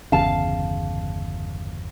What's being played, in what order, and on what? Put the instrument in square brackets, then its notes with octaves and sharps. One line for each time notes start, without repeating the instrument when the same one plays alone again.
[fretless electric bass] G1 E2 C#3 [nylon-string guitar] F5 A5